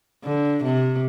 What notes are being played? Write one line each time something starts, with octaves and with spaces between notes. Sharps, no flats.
D3
C3